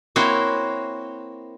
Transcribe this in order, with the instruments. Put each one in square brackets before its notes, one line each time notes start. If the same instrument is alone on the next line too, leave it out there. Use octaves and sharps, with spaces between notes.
[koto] A#3 C4 E4 F#4 C#5